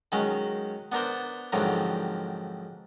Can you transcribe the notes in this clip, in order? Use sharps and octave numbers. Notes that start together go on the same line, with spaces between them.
D#3 F#3 G#3 C#4
B3 D4 A#4 C5
F2 G#2 D3 D#3 F#3